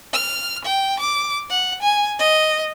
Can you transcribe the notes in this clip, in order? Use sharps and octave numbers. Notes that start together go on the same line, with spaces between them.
F6
G5
D6
F#5
G#5
D#5